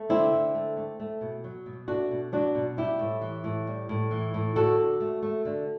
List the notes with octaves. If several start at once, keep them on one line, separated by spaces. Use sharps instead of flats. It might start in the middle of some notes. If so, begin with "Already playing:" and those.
Already playing: A3
D3 C4 E4
D3
A3
A3
A3
B2
F#3
B2
A3 D4 F#4
B2
F#3 D4 F#4
B2
G3 E4 G4
A2
E3
A2
G3
A2
E3
A2
D3 F#4 A4
D3
A3
A3
D3